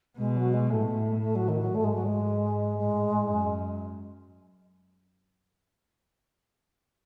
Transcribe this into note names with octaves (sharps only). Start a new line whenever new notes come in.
B2 G#3
F#3
G#3
A2 A3
A3
F#3
D#3
F#3
G#2 A3
G#3
F#3
G#3
A2 G#3
F#2